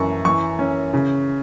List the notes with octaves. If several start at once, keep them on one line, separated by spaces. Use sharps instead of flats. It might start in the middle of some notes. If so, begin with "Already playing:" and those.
Already playing: F#2 E3 C#6
E3 C#6
C#4
C#3